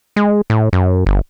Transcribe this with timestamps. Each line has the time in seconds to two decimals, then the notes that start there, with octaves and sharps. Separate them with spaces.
0.16 G#3
0.50 A2
0.73 F#2
1.06 G1